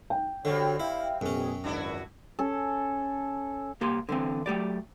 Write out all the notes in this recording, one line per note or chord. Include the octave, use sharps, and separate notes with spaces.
G5
D3 G3 C4 F#4 C#5
E4 E5 F5
A1 F#2 B2 C#4 G#4
G#1 C#2 D4 E4 F#4
C#4 A4
C2 A#3 G4 C6
D3 E3 C4
F#3 A3 G4 D5